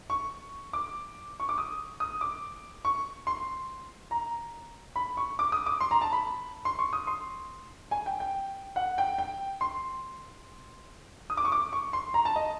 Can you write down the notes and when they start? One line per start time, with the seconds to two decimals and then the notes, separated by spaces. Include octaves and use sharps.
0.10 C#6
0.73 D6
1.40 C#6
1.49 D6
1.58 D#6
2.00 D#6
2.21 D6
2.85 C#6
3.27 C6
4.11 A#5
4.96 B5
5.17 C#6
5.39 D6
5.52 D#6
5.66 D6
5.81 C6
5.91 A#5
6.01 A5
6.13 B5
6.65 C6
6.79 C#6
6.93 D#6
7.07 C6
7.91 G#5
8.06 G5
8.20 G5
8.76 F#5
8.98 G5
9.18 G5
9.61 C6
11.30 D#6
11.37 D6
11.45 C#6
11.52 D6
11.73 C#6
11.93 C6
12.14 A#5
12.25 A5
12.36 D#5